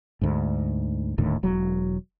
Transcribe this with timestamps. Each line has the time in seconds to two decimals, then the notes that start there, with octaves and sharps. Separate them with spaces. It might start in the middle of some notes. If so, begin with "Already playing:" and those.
0.21 D2 G#2
1.18 D#1 D#2 A2 D3
1.43 E1 F#3